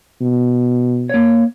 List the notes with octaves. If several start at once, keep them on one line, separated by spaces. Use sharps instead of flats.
B2
A#3 C#5